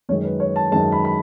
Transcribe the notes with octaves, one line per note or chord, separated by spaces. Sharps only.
F#2 D#3 G#3 C#5
B4
C#5
A5
F#2 D#3 G#3 A5
B5
B5